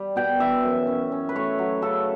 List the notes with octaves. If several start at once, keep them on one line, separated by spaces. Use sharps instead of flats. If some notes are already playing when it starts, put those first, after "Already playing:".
Already playing: G3
B2 G5
E3 E5
F#2
C#4
C#4
B4
A3 C#5
F#3
C#3 A4